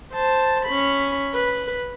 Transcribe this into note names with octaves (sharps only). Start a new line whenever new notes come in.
C5 A5
C#4 B5
B4